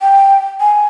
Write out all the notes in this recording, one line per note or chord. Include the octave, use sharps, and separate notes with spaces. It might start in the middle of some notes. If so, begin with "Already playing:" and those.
G5
G#5